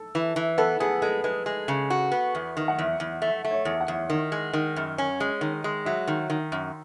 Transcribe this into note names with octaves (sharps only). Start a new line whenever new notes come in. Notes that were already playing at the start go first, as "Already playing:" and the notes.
Already playing: A4
E3
E3
B3 A4
B3 G#4
G#3 A4
G#3 B4
G#3
C#3
F#4
B3
E2
D#3
F#5
E2 E5
E2
A3 E5
A3
C#5
E2
F#5
E2
D#3
G#3
D#3
F#2
C#4
G#3
D#3
G#3
F#3 E5
D#3
D#3
F#2